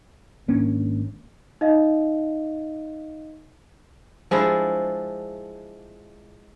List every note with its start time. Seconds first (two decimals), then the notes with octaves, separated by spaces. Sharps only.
0.48 G#1 A#3 C#4 D4
1.61 D#4 D#5 F5
4.31 F3 G#3 D4 E4